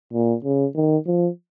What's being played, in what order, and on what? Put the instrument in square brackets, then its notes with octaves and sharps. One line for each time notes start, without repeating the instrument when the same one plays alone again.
[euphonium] A#2
C#3
D#3
F3